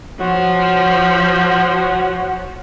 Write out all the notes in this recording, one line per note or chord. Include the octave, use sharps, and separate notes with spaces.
F3 F#4 C#5